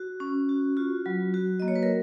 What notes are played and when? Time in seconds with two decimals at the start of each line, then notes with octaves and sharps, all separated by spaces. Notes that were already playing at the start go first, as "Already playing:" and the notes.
Already playing: F#4
0.20 C#4
0.49 F#4
0.77 F4 F#4
1.06 F#3
1.34 F#4
1.60 A#3 D#5
1.68 C#5
1.76 B4
1.83 A#4